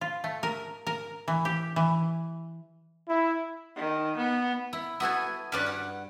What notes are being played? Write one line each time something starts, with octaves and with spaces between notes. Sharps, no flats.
F4
A3
A#4
A#4
E3
G4
E3
E4
D#3
B3
E4
B3 E4 F#4 A4 G#5
G2 C#4 B4 D5 F#6
F#5